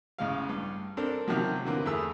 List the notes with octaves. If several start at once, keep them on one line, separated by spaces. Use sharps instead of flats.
A1 C#3 G#3 F5
G2
C4 D4 A4 A#4
C3 D#3 F3 F#3
D3 E3 A#3 C4
E2 A3 E4 G#4 E6